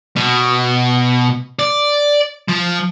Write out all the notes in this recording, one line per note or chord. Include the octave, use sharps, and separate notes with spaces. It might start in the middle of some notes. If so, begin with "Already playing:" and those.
B2
D5
F3